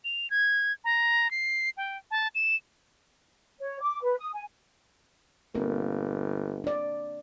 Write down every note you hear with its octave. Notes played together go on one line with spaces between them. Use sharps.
F7
G#6
A#5
C7
G5
A5
E7
C#5
D6
B4
D#6
G#5
G1 A#3 C4 A#4
D4 D5